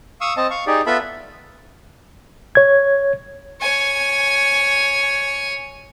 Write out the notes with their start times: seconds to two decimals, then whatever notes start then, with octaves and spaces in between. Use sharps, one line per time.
0.21 F5 C#6 D#6 E6
0.37 C4 D#5 A5
0.50 F5 C#6
0.67 D#4 G4 G#4 D5
0.86 B3 F4 A4 E5 B5
2.55 C#5 G#6
3.61 C#5 G#5